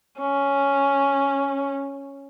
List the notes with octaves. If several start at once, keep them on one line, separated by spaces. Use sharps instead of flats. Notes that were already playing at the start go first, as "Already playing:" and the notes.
C#4